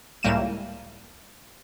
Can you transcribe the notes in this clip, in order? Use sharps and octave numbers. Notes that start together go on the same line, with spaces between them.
C#2 A2 G3 A#3 D#7 E7